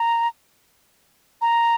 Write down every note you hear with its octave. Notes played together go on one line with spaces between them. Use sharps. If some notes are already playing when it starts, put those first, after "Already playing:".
Already playing: A#5
A#5